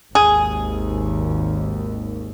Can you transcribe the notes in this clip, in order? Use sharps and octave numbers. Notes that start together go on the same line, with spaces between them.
G#1 D#2 G#4